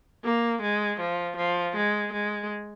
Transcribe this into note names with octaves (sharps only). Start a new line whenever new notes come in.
A#3
G#3
F3
F3
G#3
G#3